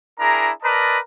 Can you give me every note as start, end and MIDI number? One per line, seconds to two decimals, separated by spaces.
0.20 0.50 62
0.20 0.50 64
0.20 0.50 68
0.20 0.50 70
0.20 0.50 82
0.63 0.98 70
0.63 0.98 71
0.63 0.98 74
0.63 0.98 75
0.63 0.98 81
0.63 0.98 82